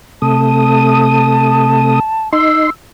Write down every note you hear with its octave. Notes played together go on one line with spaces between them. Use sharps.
C3 A3 A5 D#6
D#4 C6 E6